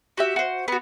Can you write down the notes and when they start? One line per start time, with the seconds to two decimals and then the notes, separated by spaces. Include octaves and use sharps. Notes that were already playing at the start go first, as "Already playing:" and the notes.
0.17 F#4 G4 E5
0.36 F#4 C5
0.68 B3 F#4